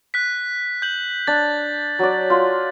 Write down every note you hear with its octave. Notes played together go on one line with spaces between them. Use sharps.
F#6 B6
G6 F#7
D4 A6
F#3 D5
F4 C6